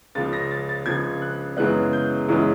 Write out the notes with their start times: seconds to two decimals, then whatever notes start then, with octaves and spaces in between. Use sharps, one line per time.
0.15 C#2 C#3 F3 A6
0.33 A#6
0.51 A6
0.69 A6
0.86 C#2 C#3 F3 G#6
1.22 F#6
1.57 F#2 C#3 E3 G#3 B3 F#6
1.93 G6
2.28 F#2 C#3 E3 G#3 B3